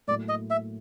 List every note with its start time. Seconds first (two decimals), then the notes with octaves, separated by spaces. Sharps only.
0.08 A2 F#3 A#3 D5
0.29 D#5
0.50 E5